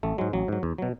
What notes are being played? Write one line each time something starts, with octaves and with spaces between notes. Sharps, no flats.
A1 A3
G#2 F#3 G#3
A1 F#3
G#2 F#3
E2
B2 F#3